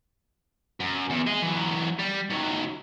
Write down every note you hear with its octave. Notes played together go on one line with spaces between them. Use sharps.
F#2
E2
G#4 D#5
E3 F#3
G3
D#3 F#3